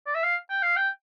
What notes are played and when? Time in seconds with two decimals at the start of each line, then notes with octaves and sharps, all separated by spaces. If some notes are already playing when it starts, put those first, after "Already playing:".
0.07 D5
0.15 E5
0.24 F5
0.50 G5
0.63 F5
0.77 G5